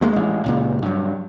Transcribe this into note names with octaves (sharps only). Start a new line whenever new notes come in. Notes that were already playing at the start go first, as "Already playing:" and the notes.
D2 G#3 A#3
A1 G#3
C#2 A#2 C#3
G2 F#3